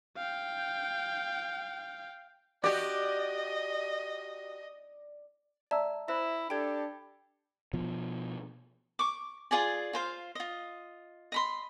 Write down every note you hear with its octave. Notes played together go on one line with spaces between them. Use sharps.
F5 G5
F#4 G4 D5 D#5
D5 E5 A5 A#5 E6
E4 C5 E5 B5
D4 G4 A4 G5 B5 G#6
B2 F3
C#6 D6
F4 G#4 D5 G#5
F4 C5 F5
F4 D#5
D#5 B5 C6